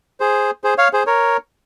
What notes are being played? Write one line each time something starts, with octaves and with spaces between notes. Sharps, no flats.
G#4 C5
G#4 C5
C#5 F5
G#4 C5
A#4 C#5